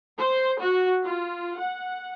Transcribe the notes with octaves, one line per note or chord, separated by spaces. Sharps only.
C5
F#4
F4
F#5